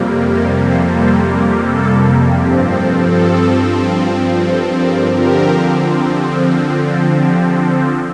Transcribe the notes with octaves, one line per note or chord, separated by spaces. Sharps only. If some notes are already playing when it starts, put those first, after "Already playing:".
Already playing: F2 C3 G3 A#3
G4 A#4
A4 C5
A4 C5
G4 A#4
A4
G2 F3 C4 G4
A4
A4
A4 C5
A#4 D5
D3 F3 C4 G4 A#4
A4
G4
A4